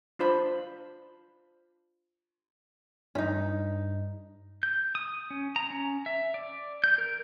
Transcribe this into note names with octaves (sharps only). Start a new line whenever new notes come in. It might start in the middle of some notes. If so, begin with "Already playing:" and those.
D4 F4 C5 B5
G2 C#4 D#4
G6
D#6
C#4
A#5
C#4
E5
D5
G6
A#4